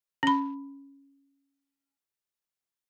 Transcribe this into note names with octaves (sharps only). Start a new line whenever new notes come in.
C#4 B5